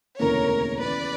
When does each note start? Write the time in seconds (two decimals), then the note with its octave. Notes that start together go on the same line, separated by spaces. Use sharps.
0.19 E1 D2 C#3 E3 A#3 A#4 C#5
0.82 E2 C#3 E3 B4 D5